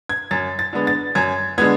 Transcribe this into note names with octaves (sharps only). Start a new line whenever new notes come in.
G#6
F#2 A6
A6
D3 G#3 B3
A6
F#2 G#6
D3 G#3 B3 G#6